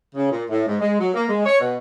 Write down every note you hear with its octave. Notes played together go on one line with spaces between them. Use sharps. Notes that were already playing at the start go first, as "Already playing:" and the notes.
C#3
A#2
A2
G#2
G#3
F#3
A#3
G#3
C#5
B2